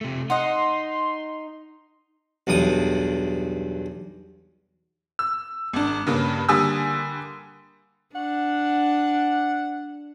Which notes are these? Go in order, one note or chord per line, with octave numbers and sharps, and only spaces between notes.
C3 A3
D#4 D#5 F#5 C6
B1 E2 G2 D#6
E6
G#1 D4
G2 C#3 A#3
D3 G3 A#3 G#5 D#6 E6
D4 F#5